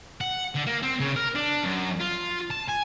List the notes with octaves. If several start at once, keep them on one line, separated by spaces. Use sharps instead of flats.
F#5
D3
A#3
C4
C#3
A#4
D4
F#2
F4
A5
G#5